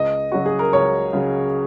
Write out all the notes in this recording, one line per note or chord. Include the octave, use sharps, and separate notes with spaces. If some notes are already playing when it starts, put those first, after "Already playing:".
Already playing: C#2 D#5
C#3 F#3 F#4
G#4
A#4
C#2 C#5
C#3 F#3